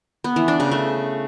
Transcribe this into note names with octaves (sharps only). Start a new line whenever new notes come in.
B3
E3
D4
C#3
A3